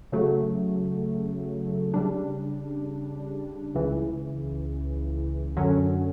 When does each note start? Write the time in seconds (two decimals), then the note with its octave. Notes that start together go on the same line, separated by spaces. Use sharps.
0.12 C#3 F#3 A3
1.94 C#3 G3 D4
3.75 C#2 C#3 E3
5.56 F#2 D3 F#3 C#4